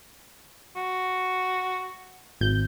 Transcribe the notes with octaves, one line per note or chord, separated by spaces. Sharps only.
F#4
G#1 G6